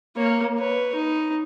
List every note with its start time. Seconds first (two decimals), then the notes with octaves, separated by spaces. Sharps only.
0.16 A#3 C#5
0.58 B4 C#5
0.95 D#4